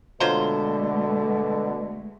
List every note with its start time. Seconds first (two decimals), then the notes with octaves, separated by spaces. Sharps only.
0.20 B2 D3 F#3 G#3 A3 F4 C5